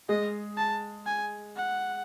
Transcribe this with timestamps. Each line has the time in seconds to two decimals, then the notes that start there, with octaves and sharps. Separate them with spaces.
0.09 G#3 G#4 D#5
0.57 A5
1.06 G#5
1.56 F#5